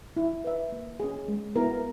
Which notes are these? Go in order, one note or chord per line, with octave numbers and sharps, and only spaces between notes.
E4
B4 E5
A#3
C#4 G#4
G#3
B3 E4 A#4